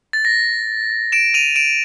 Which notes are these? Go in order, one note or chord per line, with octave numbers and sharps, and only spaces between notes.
A6
A#6
D7 E7
D#7 F7
D7 E7